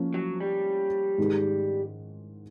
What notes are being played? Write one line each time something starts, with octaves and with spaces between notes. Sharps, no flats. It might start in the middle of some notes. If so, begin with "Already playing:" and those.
Already playing: F3 A#3 C#4
F#3
G3
G#2 D#3 G#3